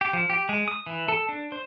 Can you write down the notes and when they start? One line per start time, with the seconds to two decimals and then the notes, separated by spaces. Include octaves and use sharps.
0.01 G4
0.13 F3
0.30 G4
0.49 G#3
0.68 D#6
0.86 E3
1.08 A4
1.29 D4
1.52 C5